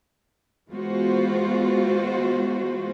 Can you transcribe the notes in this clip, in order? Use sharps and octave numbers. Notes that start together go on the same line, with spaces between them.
E3 G#3 B3 F4 F#4 C5